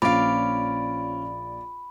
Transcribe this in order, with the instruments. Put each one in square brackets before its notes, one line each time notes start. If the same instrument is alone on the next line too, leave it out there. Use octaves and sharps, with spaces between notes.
[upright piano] A#1 [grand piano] F3 C#4 D7 [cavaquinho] D5 F5 [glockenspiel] B5